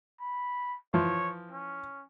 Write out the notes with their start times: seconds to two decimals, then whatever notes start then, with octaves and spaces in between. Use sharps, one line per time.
0.20 B5
0.94 E3 F3 C#5
1.52 C#4